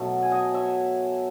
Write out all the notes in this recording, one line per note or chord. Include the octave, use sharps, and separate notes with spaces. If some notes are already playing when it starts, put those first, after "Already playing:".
Already playing: B2 F#3 A3
G#5
D#5 F#5
C#5 E5